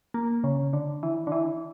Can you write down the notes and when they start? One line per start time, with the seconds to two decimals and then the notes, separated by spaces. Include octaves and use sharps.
0.14 A#3
0.44 C#3
0.73 D3
1.03 E3
1.27 D3
1.32 E3